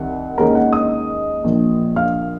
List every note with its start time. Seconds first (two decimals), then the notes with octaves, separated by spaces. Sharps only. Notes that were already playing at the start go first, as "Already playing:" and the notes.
Already playing: C2 D#3 F#5
0.38 D#2 D#3 G#3 C#4 A#4 A#5
0.55 F#5
0.73 D#5 D#6
1.44 A#1 A#2 F3
1.96 F5 F6